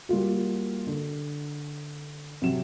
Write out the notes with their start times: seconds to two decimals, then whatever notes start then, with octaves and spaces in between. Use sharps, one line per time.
0.09 G3 A#3 F4 F#4
0.87 D3
2.42 C3 F#3 E7